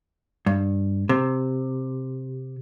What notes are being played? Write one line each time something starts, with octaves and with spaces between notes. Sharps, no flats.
G2
C3